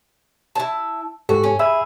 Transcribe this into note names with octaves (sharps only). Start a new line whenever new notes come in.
E4 A5
G#2 F#4 G4 A4
C#4
G#4 E5 B5 E6